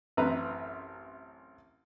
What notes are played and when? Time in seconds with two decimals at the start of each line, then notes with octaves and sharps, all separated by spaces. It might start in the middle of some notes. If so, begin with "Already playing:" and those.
0.17 A1 F#2 C4 B4 A#5